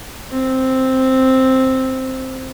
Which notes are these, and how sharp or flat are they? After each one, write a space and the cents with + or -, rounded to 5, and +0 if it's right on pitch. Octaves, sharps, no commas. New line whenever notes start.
C4 +0